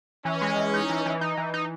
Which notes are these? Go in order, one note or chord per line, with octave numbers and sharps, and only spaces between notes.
E3 C#4
G#3
E3
D#4
E3
E3
D#4
E3
D#4